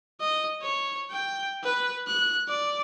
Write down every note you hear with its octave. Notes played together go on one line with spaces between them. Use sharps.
D#5
C#5
G5
B4
F#6
D5